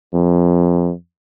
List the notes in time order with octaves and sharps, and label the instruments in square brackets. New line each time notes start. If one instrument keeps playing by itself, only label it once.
[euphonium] F2